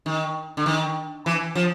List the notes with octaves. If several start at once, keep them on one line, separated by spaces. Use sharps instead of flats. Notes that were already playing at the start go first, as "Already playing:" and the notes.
D#3
D3
D#3
E3
F3